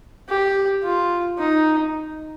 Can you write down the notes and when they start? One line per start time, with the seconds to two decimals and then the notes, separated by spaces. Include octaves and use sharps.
0.29 G4
0.84 F4
1.39 D#4